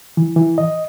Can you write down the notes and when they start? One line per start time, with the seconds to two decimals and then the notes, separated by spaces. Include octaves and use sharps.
0.17 E3
0.36 E3
0.58 D#5